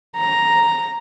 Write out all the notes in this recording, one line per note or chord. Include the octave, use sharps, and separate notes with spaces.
A#5